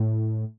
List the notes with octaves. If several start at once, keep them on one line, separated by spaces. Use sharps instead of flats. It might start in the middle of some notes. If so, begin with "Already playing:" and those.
Already playing: A2